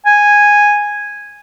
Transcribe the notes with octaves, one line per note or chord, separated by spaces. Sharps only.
G#5